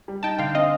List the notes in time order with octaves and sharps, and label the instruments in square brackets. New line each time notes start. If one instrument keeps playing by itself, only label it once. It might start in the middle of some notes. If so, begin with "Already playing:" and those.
[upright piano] G3
[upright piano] D#4 [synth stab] G5 A5
[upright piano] D3 [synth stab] F5 G5
[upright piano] C4 [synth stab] D#5 F5